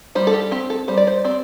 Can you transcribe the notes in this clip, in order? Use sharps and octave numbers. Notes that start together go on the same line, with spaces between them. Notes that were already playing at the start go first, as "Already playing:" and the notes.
G3 C5
A4
G4
C4 G4
A4
G3 C5
D5
C5
C4 D5